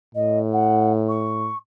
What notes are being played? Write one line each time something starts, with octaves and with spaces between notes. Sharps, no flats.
A2 D#5
F#5
C#6